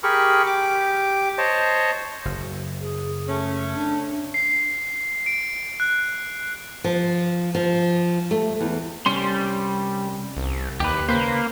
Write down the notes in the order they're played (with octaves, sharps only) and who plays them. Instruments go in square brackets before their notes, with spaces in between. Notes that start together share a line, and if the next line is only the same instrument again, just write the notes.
[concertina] G4 G#4 A#4 B5 C#6
G4 D6
C5 C#5 D#5 A5
[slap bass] F#1
[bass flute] G#4
[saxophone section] A3 C#4
[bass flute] D4
[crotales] C7
D7
F#6
[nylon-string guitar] F3
F3
A3
E2
[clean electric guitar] C2 C#4 C6 [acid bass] G3
[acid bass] C2
[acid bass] D#2 [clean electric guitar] G4 B4
[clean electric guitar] C#3 B4 C5 [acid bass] A#3